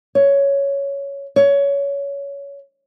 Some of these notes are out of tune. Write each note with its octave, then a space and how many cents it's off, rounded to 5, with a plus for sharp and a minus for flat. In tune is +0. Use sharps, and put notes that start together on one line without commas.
C#5 +5
C#5 +20